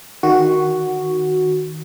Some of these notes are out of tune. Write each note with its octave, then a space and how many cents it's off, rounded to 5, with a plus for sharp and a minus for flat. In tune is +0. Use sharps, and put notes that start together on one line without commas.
D#3 +0 F#4 +0